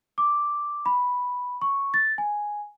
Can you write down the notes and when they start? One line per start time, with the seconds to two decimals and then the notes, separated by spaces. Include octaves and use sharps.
0.18 D6
0.86 B5
1.61 C#6
1.94 A6
2.18 G#5